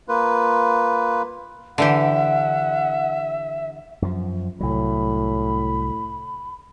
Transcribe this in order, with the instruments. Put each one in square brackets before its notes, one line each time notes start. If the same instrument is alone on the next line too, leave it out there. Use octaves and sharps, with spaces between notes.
[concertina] A#3 F4 B4
[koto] D3 E3 G4 [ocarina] E5 [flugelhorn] F#5
[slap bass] F#2 F3
[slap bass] C2 F#3 [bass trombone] A2 [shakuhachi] B5